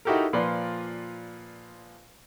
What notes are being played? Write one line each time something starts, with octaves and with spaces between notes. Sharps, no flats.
D#4 E4 F#4 G4 A4 A#4
A#2 F3 B4 D5 C6